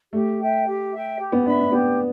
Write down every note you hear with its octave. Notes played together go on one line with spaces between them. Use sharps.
A3 G4
E5 G5
G4
E5 G5
G4
B3
D4 E5 B5
D4
B3 G4